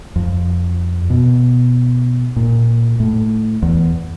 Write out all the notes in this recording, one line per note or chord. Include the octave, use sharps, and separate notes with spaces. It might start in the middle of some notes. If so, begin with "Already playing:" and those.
F2
B2
A#2
A2
E2